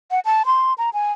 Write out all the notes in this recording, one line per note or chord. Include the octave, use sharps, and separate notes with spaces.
F#5
A5
C6
A#5
G#5